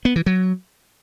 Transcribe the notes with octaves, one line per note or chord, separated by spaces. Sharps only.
B3
E3
F#3